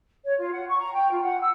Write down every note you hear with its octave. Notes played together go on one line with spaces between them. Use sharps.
C#5
F4
F#5
C#6
A#5
G5
F4
F#5
E6